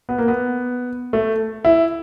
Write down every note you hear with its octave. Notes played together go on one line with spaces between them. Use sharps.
B3
A#3
B3
A3
E4